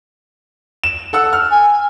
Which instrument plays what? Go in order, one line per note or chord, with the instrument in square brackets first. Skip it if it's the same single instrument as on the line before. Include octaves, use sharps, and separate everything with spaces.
[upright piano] E7
A4 F#5 E6
F6
[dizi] G#5